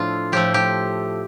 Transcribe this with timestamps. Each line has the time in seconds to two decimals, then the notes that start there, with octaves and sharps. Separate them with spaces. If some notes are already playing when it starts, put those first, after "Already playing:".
Already playing: A2 F3 A3 D4 F4
0.32 A2 F3 A3 G4
0.54 G4